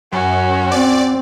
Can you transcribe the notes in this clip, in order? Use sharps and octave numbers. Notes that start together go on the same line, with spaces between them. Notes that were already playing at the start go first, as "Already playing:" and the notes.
F#2 C#4 F#4
C4 D5